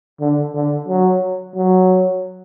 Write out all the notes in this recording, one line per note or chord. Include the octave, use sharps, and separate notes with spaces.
D3
D3
F#3
F#3